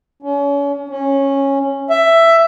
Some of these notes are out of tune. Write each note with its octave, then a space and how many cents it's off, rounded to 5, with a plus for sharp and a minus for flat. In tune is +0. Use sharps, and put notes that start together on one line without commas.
C#4 +35
C#4 -10
E5 +10